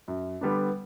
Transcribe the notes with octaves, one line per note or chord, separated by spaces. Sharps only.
F#2
D3 G3 B3 D4